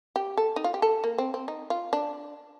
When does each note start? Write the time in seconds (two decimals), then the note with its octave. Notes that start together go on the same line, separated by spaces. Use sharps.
0.16 G4
0.37 A4
0.56 D#4
0.64 F4
0.74 G4
0.82 A4
1.04 A#3
1.18 C4
1.34 C4
1.48 D#4
1.70 F4
1.93 D4